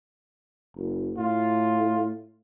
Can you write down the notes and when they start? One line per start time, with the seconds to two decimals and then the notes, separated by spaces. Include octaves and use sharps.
0.76 F#1
1.17 A2 F4